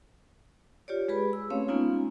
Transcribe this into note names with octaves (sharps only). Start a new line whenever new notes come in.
F4 G4 C#5 D5
G#3 G4 G#4 B4 B5
E6
A3 C4 C#4 C#5 F5
G#3 A#3 B3 C#4 D#4 F4